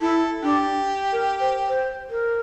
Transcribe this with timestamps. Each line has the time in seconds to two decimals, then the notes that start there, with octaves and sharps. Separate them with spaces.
0.01 E4 A4
0.43 D4 G4
1.12 A#4
1.40 C5
1.68 C5
2.10 A#4